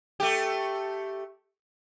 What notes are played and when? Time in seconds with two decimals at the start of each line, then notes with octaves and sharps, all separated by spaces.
0.20 A3 G4